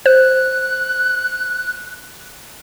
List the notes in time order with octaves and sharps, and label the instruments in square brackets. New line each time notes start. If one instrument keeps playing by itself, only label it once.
[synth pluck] C5 [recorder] F#6